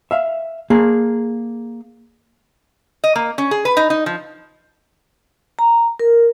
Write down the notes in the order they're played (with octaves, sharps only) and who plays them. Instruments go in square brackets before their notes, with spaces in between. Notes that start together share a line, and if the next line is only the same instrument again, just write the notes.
[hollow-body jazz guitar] E5 F5
A#3 G#4
[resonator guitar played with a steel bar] D#5
A#3
C#4
G#4
B4
D#4
D#4
F3
[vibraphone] A#5
A#4